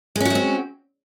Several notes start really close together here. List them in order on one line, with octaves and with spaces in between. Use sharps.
G#3 C#4 F#4 A3 C4